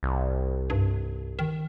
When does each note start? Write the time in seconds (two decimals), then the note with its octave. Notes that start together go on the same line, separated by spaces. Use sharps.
0.03 C2
0.70 G2
1.39 D#3